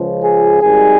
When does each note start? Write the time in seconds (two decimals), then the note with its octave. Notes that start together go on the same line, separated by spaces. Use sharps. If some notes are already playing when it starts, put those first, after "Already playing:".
Already playing: C#2 C#3 F3
0.24 G#4
0.61 G#1 G#2 D#3 G3 G#4